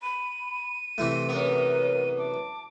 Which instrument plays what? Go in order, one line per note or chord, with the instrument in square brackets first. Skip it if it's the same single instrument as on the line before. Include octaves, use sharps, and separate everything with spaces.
[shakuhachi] B5 [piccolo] D#7
[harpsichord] C3 E3 A3 [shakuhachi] C6
[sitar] F#2 B3 [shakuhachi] A#4
[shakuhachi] A5 [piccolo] D6